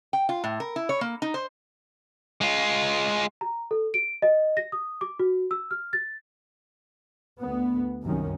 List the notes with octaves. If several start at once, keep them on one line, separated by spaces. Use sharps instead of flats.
G5
F4
A2
A#4
E4
C#5
A#3
D#4
C5
G#3 F4
A#5
A4
D7
D#5
A#6
D#6
D6
F#4
E6
F6
A6
D2 B3
C2 F#2 D#3 C#4